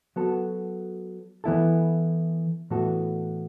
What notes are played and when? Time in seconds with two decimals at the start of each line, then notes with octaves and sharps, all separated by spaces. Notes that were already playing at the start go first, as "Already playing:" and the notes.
0.16 F#3 B3 F#4 A4
1.44 E3 B3 E4 A4
2.70 A2 E3 B3 F#4 A4